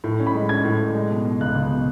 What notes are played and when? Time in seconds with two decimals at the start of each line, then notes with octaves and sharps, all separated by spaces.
0.04 A2
0.20 C#4
0.26 B5
0.34 G#3
0.49 C#4 G#6
0.65 A2
0.80 A2
0.95 G#3
1.11 B2
1.25 B2
1.40 C#2 F#6
1.55 C#2
1.71 B2